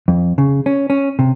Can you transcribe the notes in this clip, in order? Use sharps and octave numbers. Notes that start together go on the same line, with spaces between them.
F2
C#3
C#4
C#4
C3